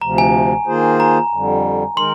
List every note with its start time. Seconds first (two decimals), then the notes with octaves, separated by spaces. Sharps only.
0.02 D2 C3 F3 A#5
0.18 G#5
0.67 D#3 A#3 F4 G#4 C5
1.00 A#5
1.32 F2 D3 G3
1.96 D#3 G#3 D#4 A#4 C6